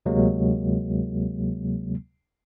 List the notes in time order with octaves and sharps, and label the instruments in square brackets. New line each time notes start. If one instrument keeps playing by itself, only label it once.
[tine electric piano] D2 C3 F#3 G#3 A#3